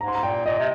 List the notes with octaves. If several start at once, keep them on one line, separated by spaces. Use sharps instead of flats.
G#2 A#5
C6
A#5
A#2 G5
A#2 D#5
C3